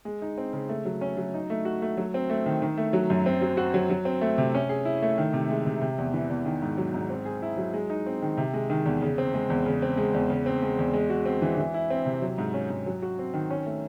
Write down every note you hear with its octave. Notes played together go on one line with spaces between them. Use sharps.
G#3
D#4
C4
C#3
A3
F#3
C#4
F#3
D#4
A3
F#4
A3
F#3
C4
A3
D#3
D#3
A3
F#3
F#2
C4
F#3
F#4
F#3
F#3
C4
A3
C3
C#4
G#4
E4
A3
D#3
C3
G#3
C3
C3
E2
E3
E2
D#3
G#2
F#3
G#2
C4
G#4
E4
F#3
G#3
D#4
C4
D#3
C3
G#3
D#3
E2
C#3
C4
G#3
E2
C#3
C4
G#3
E2
C#3
C4
G#3
E2
G#3
F#4
C4
E3
E3
E4
C4
C3
F#3
G#2
C#4
G#2
F#3
F#4
C4
D#3
C#4
A3